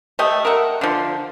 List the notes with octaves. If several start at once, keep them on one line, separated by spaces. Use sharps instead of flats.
A3 G4 D#5
A#4 E5 F#5
D3 F3